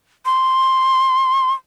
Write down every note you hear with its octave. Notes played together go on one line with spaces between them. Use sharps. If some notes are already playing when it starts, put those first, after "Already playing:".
C6